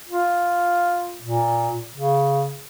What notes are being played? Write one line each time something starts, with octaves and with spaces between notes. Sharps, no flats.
F4
A#2
C#3